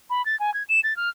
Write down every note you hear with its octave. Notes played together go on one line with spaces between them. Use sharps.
B5
A6
G#5
G#6
E7
A6
F6